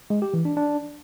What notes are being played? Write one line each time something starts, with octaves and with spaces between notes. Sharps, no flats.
G#3
G4
E3
D4
D4